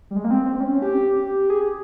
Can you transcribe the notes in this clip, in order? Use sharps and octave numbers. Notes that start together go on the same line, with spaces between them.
G3
G#3
A#3
C4
C4
C4
C#4
G4
G#4